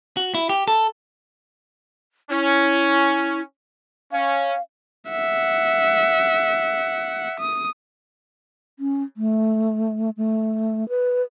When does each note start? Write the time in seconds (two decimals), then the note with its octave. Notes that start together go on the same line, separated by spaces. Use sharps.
0.17 F#4
0.35 E4
0.49 G4
0.68 A4
2.30 C#4 E4
4.12 C#4 F5
5.10 E5 F#5
7.40 D#6
8.78 C#4
9.17 A3
10.17 A3
10.89 B4